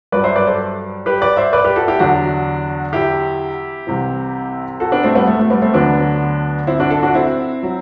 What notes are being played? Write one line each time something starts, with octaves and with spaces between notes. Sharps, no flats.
G2 F#3 B4 D5
C5 E5
B4 D5
A4 C5
G4 B4
B4 D5
C5 E5
B4 D5
G4 B4
F#4 A4
E4 G4
E2 D3 F#3 D4 F#4
E4 G4
C2 C3 E3
F#4 A4
B3 D4
A3 C4
G3 B3
A3
A3
G3 B3
A3 C4
D2 D3 F#3 B3 D4
C4 E4
D4 F#4
F#4 A4
D4 F#4
C4 E4
F#3